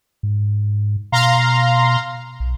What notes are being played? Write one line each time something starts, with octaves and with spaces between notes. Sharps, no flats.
G#2
B2 F5 A#5 C6
B1